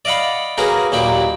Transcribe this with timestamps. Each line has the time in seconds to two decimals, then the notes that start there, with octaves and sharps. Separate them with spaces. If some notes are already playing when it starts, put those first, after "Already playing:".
0.05 D5 D#5 F5 F#5 B5
0.57 A#3 C#4 F#4 G#4 A#4 B4
0.92 D#2 A#2 F#3 A#3 G4 B5